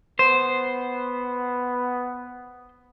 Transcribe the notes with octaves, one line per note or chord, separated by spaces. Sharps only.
B3 C5